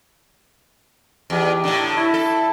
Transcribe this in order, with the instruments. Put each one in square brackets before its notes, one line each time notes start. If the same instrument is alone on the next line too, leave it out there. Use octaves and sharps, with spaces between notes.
[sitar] E2 [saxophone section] D#4 G4
[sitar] A2 D3
[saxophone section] E4
[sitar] A4